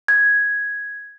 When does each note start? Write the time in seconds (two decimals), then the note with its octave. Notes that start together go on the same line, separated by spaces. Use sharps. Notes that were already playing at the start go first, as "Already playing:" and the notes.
0.08 G#6